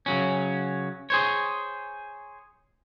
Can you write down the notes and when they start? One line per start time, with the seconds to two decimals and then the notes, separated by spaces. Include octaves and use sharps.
0.06 C#3 F#3 C#4
1.10 G#4 C5 C#5